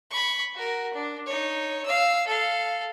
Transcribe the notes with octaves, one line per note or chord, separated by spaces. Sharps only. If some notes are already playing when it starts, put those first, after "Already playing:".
B5 C#6
F#4 A#4
D4
D#4 C#5
F5 E6
A4 F5